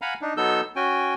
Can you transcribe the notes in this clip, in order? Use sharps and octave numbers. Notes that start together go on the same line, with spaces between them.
F5 F#5 G#5 A#5 B5
D4 D#4
F#3 B3 D#4 A4 E6 G6
C#4 F#4 G5 G#5